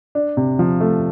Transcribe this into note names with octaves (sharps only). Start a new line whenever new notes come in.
D4
C3
F3
A3